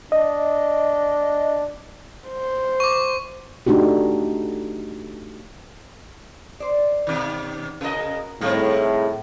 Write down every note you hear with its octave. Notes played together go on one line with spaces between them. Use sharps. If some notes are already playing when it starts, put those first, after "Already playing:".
D4 D#5
C5
C#6 D6
A3 D4 D#4 F#4 G4
C5 D5
B2 D#3
C#3 F#4 A#4 B4 D#5
A2 D#3 G3 G#3 C4